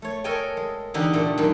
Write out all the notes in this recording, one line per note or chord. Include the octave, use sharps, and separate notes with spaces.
A3 C#5
A4 A#4 C#5 D#5 G5 G#5
G#3
E2 D3 D#4 G4 F#5
A#2 A3
F#2 D#3